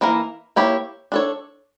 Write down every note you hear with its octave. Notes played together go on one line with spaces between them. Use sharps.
E3 A#3 E4 A#4
A#3 E4 G4 C#5
D4 A4 C#5